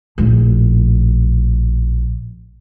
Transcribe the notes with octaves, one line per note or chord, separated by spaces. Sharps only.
A#1 A2